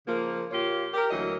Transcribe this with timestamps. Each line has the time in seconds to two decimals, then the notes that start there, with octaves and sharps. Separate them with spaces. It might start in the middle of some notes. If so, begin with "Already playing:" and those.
0.07 C#3 F3 A#3
0.51 A#2 A#3 F4 G4 C#5
0.94 G4 A#4
1.11 D2 E3 F#3 A#3 D#5